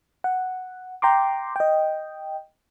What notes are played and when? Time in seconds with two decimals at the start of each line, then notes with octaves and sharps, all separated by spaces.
0.24 F#5
1.02 G5 A#5 C6 D6
1.56 D#5 G5